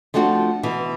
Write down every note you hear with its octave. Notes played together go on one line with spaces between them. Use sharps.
F3 A3 C4 D4 F#4
B2 E3